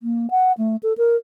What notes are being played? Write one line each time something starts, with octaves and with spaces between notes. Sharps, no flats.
A#3
F#5
A3
A4
A#4